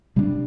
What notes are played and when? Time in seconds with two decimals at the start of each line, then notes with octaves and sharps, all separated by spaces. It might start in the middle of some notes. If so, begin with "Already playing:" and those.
0.16 C3 G3 B3 D4